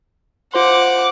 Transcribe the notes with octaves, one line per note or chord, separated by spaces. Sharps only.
F4 C5 F#5 C6 D6